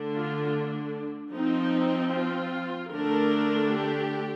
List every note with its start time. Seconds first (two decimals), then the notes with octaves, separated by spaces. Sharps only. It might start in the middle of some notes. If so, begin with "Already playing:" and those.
Already playing: D3 A3 D4
0.15 F4
1.33 F3 C4 D#4
2.13 F4
2.92 D3 A3 D4 A#4
3.72 G4